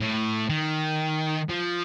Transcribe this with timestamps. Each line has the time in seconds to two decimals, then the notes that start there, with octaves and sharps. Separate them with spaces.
0.01 A2
0.50 D#3
1.49 F3